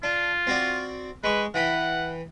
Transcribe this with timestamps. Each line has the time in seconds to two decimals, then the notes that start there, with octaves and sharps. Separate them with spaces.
0.03 D4 F4
0.47 C4 F#4 D5
1.24 G#3 B4 C#6
1.54 E3 F#5 G5 B5